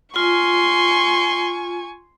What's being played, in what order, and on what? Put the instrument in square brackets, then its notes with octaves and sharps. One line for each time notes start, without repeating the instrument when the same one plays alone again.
[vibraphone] F4 [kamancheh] G#5 C#6 [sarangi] C6